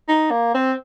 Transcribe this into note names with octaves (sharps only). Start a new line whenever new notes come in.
D#4
A#3
C4